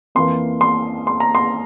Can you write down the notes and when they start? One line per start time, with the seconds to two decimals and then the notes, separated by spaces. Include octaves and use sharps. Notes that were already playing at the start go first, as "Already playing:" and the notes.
0.15 F2 E3 A#3 C6
0.61 C6
1.07 C6
1.20 A#5
1.35 C6